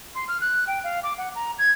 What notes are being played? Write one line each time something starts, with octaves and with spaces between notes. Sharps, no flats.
C6
F6
F#6
G5
F5
D6
F#5
A#5
G#6